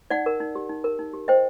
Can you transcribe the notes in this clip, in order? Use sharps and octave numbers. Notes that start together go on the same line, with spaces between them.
D#4 D5 F#5
A#4
D#4
G4
D#4
A#4
D#4
G4
C5 D#5 G5